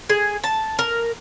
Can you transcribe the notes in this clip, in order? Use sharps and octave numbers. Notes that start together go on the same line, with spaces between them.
G#4
A5
A#4